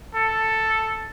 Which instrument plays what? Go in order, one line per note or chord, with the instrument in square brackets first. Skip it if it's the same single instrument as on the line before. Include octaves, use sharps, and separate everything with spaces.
[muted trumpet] A4